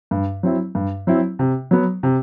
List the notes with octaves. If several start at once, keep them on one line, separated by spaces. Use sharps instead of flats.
G2
F#3 C4 E4
G2
F#3 C4 E4
C3
F#3 B3
C3